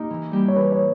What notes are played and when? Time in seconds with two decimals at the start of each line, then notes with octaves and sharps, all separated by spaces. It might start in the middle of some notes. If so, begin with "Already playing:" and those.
Already playing: A#3 D#4 G4
0.10 E3
0.31 G3 A#3 E4 G4
0.48 C#5
0.56 E3 B4
0.72 C#5